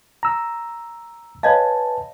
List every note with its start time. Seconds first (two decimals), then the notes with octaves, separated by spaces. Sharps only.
0.23 A#5 E6
1.43 B4 C#5 D#5 F5 G#5 A5